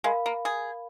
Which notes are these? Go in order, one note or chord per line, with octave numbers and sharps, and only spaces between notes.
G#3 A#4 F5 B5
A#3
G#4